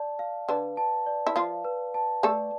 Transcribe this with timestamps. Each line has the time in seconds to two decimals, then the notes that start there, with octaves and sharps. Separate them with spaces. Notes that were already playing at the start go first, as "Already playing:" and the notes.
Already playing: D5 A5
0.19 F5
0.48 D3 D4 B4
0.77 A5
1.06 D5
1.27 E4
1.36 F3 F4 F5
1.65 B4
1.94 A5
2.23 A3 A4 D5